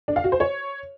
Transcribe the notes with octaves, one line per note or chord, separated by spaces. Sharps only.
D4
F5
F#4
C5
C#5